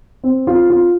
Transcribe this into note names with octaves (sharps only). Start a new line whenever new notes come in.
C4
F4
F4